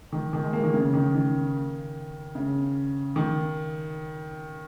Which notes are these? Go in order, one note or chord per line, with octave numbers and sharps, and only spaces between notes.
D#3
D#3
G#3
A#3
D#3
C#3
D#3
D#3
C#3
D#3